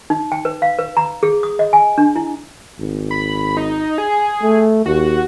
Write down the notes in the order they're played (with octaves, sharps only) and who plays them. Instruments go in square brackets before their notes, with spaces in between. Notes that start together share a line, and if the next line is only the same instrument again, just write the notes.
[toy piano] D#4
G5
B4
F5
B4
A#5
G#4
D#6
D#5
G#5
D4
E4
[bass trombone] G#1
[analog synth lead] B5
D#4
G#4
[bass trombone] A3
[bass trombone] D#2 [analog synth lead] F#4